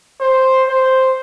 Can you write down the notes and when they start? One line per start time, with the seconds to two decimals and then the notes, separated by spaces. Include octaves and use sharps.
0.20 C5
0.68 C5